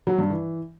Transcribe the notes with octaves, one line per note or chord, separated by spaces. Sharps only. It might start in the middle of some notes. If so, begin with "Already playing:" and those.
F#3
G2
E3